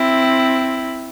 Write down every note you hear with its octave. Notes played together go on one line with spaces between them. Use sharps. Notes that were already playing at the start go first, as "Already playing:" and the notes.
Already playing: C4 E4